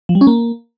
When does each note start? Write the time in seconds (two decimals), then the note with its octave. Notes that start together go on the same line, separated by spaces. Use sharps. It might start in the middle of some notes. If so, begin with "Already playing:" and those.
0.09 F3
0.15 G3
0.21 C#4
0.27 A#3